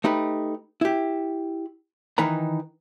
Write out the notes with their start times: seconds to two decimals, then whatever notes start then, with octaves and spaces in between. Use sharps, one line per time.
0.04 A3 D#4 G4 B4
0.81 E4 G4
2.18 D#3 E3 D#4 B4 A#5